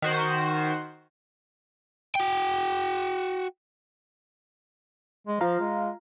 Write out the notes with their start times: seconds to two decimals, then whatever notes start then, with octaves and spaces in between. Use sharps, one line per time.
0.02 D#3 F#4 C5
2.15 F#4 G5
5.28 G#3
5.41 F3 F4 F5 A#5
5.60 G#3